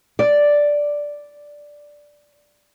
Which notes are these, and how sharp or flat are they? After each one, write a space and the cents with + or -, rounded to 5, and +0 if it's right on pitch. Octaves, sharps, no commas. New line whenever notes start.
D5 +0